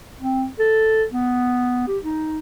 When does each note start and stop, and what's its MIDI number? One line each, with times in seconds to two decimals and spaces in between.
0.21 0.46 60
0.59 1.05 69
1.12 1.86 59
1.87 1.98 67
2.04 2.39 63